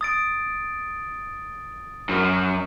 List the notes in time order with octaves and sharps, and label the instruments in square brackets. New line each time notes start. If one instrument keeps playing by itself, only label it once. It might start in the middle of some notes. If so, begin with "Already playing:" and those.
[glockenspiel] D#6 A6 D7
[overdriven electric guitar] F#2